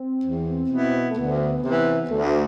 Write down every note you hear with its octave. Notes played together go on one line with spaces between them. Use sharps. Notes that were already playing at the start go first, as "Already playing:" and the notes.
Already playing: C4
E2
B2 B3 E4
A3
D2 B3
C3 E3
D2 A3